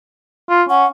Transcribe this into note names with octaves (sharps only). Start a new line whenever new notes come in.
F4
C#4 F#5